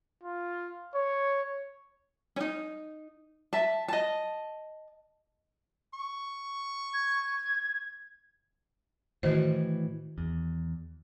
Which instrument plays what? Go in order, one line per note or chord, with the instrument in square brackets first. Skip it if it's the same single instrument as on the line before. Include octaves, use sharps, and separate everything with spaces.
[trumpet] F4
C#5
[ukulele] C#4 D#4
E5 A5
D#5 A5
[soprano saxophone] C#6
[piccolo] G#6
[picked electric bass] A2 E3 [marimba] D#3 F#4 C5
[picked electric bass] E2